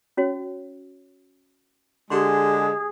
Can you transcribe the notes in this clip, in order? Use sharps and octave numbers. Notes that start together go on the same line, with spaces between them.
C#4 F#4 C#5
D3 G#3 G4 G#4 C6